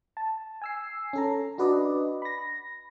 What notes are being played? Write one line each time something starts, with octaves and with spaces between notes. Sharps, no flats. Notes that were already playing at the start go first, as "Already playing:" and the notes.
A5
G#5 E6 C7
C#4 A4 A#5
D4 F#4 B4 D5 D#5
B5 A#6